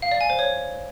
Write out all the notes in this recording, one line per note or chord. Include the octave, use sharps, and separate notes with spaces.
F5
D5
G#5
C5
C#5